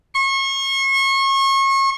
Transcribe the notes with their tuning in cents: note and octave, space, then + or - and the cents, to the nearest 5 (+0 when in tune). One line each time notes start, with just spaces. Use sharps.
C#6 -35